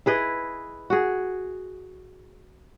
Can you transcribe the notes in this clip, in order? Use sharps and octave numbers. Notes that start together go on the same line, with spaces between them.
E4 G#4 B4 D#5
F#4 G#4